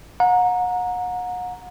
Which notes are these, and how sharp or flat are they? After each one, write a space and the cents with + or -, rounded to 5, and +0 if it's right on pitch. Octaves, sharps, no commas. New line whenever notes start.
F#5 -35 A#5 +0